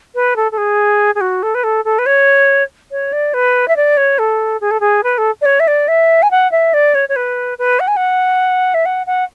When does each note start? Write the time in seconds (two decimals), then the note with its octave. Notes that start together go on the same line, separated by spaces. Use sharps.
0.15 B4
0.36 A4
0.52 A4
0.58 G#4
1.15 G#4
1.21 F#4
1.43 A4
1.55 B4
1.64 A4
1.85 A4
1.99 B4
2.06 C#5
2.91 C#5
3.13 D5
3.34 B4
3.68 E5
3.76 D5
3.97 C#5
4.19 A4
4.61 G#4
4.71 A4
4.80 G#4
5.04 B4
5.18 A4
5.41 D5
5.46 C#5
5.60 E5
5.68 D5
5.88 E5
6.23 G#5
6.31 F#5
6.52 E5
6.74 D5
6.95 C#5
7.09 C#5
7.16 B4
7.59 B4
7.80 F#5
7.88 G#5
7.97 F#5
8.74 E5
8.86 F#5
9.07 F#5